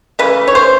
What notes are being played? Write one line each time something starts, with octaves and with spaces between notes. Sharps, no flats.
C#3 E3 A3 B4
C#5
C5